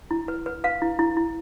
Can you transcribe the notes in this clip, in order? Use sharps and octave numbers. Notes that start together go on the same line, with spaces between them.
E4
B4
B4
B4 F5
E4
E4
E4